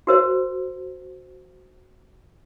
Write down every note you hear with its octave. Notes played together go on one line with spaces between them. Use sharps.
F#4 A#4 C5